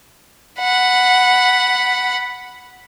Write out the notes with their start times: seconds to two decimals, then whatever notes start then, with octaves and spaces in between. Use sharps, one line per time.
0.60 F#5 B5